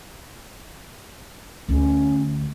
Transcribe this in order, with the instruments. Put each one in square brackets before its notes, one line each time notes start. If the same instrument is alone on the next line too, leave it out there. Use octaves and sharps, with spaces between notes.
[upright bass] D2 [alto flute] C#4